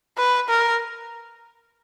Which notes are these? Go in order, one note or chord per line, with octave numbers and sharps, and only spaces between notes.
B4
A#4